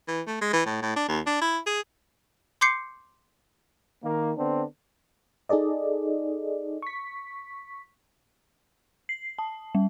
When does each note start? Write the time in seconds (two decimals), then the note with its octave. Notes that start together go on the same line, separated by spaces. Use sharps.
0.08 E3
0.28 A3
0.41 G#3
0.53 E3
0.66 A2
0.82 A2
0.96 D4
1.09 D#2
1.27 D4
1.42 E4
1.67 G#4
2.61 C6 D6 G6 C7 C#7
4.04 D#3 A#3
4.37 D3 B3 C4 D4
5.49 D#4 G#4 A4 D5 D#5
6.82 C#6 B6
9.09 C7
9.39 A5
9.75 G3